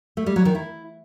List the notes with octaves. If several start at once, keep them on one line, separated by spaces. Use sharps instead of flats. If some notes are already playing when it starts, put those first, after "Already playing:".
A3
G3
F#3
D#3
E4